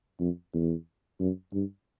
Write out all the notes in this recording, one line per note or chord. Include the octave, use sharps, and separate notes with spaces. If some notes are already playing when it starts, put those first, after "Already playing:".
F2
E2
F#2
G2